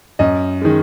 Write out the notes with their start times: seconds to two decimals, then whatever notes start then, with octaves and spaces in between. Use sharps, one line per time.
0.19 F#2 D#5
0.62 D#3 G#3